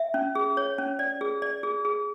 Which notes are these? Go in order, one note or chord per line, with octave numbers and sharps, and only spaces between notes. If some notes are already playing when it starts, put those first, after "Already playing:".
Already playing: E5
C#4
G#4
C#5
C#4
D5
G#4
D5
G#4
G#4